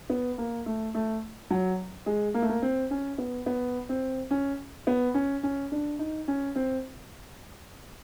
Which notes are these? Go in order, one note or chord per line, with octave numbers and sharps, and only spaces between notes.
B3
A#3
A3
A3
F#3
G#3
A#3
A3
A#3
C4
C#4
B3
B3
C4
C#4
B3
C#4
C#4
D4
D#4
C#4
C4